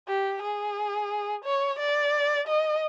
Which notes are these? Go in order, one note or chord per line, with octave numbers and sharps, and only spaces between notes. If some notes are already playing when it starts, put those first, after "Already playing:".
G4
G#4
C#5
D5
D#5